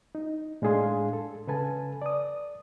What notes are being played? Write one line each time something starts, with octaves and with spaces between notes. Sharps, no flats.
D#4
A2 G#3 D4 G#4 F5 C6
A4
C#3 A4 B4 G#5 A5
D5 D#6